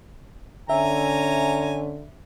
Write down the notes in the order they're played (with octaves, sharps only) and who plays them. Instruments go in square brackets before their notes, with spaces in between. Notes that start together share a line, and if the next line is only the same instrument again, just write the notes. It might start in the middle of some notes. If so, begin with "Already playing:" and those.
[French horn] D3 [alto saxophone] C#4 [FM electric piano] E5 [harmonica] G#5 A#5